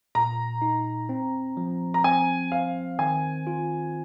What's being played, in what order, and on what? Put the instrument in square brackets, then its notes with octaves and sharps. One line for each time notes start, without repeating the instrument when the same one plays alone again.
[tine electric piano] A#2 [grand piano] A#5
[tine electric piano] D#4
C4
F3
[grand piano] A#5
[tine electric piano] C4 [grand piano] G#5
[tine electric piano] C5 [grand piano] F5
[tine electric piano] D#3 [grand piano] G#5
[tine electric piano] F4